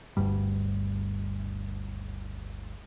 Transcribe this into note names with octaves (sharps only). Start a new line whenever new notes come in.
G1 D2 G2 G3